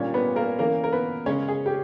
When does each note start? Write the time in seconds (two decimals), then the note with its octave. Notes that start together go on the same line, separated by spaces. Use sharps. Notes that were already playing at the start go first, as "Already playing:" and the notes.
Already playing: A#2 G3 A#3 C#4 C#5
0.14 B3 B4
0.36 A#3 A#4
0.59 E3 A#3 C#4 A#4
0.84 A#4
0.92 B3 B4
1.26 C#3 G#3 C#4 C#5
1.48 G#4
1.66 G4